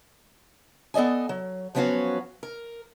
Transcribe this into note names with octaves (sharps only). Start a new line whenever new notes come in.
B3 A4 D5 D#5 G#5
F#3
F3 F#3 B3 C#4 F#4 F5
A#4